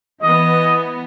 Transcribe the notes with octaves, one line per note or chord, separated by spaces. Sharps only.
E3 B3 D#5